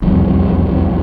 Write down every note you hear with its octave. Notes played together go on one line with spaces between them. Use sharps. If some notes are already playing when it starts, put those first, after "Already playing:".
E1 C2 F2